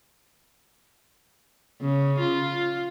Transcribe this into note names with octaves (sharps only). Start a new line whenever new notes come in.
C#3
F4